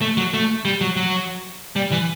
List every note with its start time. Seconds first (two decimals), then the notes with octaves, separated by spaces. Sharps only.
0.02 A3
0.17 F#3
0.34 A3
0.65 G3
0.81 F#3
0.96 F#3
1.76 G3
1.91 E3